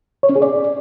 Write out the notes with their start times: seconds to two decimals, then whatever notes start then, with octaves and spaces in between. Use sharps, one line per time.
0.23 C#5
0.29 C#4
0.36 G#4
0.42 D5